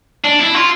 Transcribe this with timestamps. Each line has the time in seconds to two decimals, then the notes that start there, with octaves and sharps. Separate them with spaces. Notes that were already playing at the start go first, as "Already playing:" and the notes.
0.25 D4
0.39 E4
0.54 F4